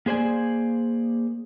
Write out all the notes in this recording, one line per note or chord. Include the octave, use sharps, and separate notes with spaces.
A#3 G#4 C5 D5 G#5